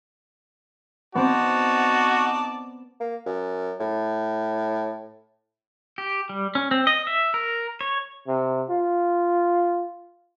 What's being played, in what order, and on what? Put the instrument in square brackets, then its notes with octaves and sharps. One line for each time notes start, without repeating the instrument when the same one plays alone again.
[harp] B3 C4 [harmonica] D#4 D5 A5 [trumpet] F#4
[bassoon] A#3
F#2
A2
[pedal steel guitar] G4
G3
C#4
C4
D#5
E5
A#4
C#5
[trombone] C3
F4